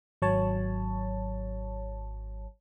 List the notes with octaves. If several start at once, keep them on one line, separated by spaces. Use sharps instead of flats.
G#1 F#3 C#5 A5